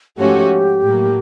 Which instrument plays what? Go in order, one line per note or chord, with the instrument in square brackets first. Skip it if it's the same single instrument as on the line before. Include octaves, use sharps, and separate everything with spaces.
[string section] G#2 F3 A3 C#4 F#4 [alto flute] G4
[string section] A2 F#3 A#3